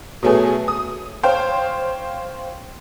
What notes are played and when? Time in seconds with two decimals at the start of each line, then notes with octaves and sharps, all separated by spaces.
0.23 B2 F#3 A3 B3 G#4
0.68 D#6
1.23 C5 C#5 F5 G5